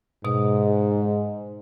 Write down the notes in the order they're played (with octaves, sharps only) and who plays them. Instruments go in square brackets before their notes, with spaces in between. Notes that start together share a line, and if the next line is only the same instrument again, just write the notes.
[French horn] G#2 [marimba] B2 D#6